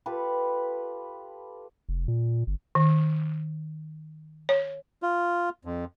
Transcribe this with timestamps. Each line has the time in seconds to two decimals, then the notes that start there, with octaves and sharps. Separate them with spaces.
0.06 F4 G4 A4 B4
1.89 F1
2.08 A#2
2.47 G1
2.75 D#3
4.49 C#5
5.02 F4
5.65 F2